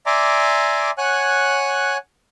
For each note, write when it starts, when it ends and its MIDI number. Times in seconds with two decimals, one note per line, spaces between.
0.06 0.91 74
0.06 0.91 76
0.06 0.91 80
0.06 0.91 82
0.06 0.91 84
0.06 0.91 86
0.98 1.97 73
0.98 1.97 78
0.98 1.97 80
0.98 1.97 90